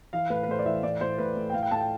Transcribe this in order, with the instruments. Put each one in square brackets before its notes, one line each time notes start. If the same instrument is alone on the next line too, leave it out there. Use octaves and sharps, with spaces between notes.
[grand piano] E3 F5
A2 B4
B4
A2 C5
D5
E3 E5
A2 D5
A2 C5
A2 B4
A2
G5
A2 F5
G5
A2 A5
G5